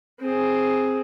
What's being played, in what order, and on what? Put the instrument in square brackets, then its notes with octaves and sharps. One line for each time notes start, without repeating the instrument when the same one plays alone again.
[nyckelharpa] C4 G#4